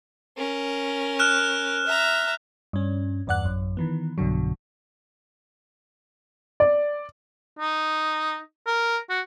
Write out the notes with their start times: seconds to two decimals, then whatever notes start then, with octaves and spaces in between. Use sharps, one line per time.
0.37 C#4 A#4
1.19 F6 F#6 E7
1.86 E5 A#5
2.73 G2 C#4
3.27 E2 G2 D5 F#5 F#6
3.45 A1 F#2
3.77 D#3 E3 B3
4.18 B1 G2 B2 D3 F#3
6.60 D5
7.59 D#4
8.67 A#4
9.10 F#4